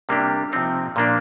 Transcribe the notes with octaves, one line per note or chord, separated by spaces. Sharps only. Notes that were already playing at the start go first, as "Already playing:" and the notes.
C3 G3 A#3 D4 G4
C3 F3 C4 D#4
A#2 F3 A#3 D4